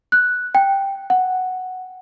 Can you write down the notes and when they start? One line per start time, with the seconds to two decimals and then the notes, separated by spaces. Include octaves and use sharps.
0.12 F#6
0.55 G5
1.10 F#5